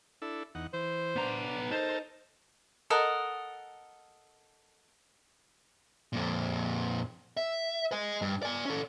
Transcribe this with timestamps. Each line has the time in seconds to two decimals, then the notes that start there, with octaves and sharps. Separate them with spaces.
0.22 D4 E4 A4
0.55 E2 D#4 F#5
0.73 E3 C5
1.16 B3 D4 A#5
1.72 D#4 A4 A#4 C5 A5
2.90 A4 A#4 D#5 F#5
6.13 F2 A#2
7.37 E5
7.92 D#5 G#5
8.22 G2
8.43 D5 G#5
8.65 C#4 A4